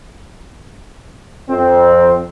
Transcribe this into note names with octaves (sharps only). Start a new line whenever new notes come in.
F2 C4